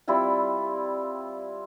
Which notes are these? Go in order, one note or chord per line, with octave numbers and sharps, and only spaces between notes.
G3 C4 E4 F4